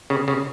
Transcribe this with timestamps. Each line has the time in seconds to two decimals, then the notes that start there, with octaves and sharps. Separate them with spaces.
0.10 C#3
0.28 C#3